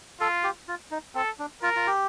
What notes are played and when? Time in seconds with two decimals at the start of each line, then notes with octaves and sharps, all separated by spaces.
0.20 F4 A4
0.44 G4
0.68 F4
0.91 D#4
1.15 C4 A4
1.39 D4
1.62 F4 A#4
1.76 F4
1.87 G4